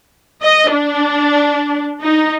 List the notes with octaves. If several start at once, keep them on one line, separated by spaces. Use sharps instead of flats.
D#5
D4
D#4